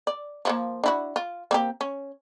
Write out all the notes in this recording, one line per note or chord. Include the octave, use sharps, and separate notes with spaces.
D5
F3 G#3 A#3
D4 E4 F#4
F4
A#3 C4 G4
C#4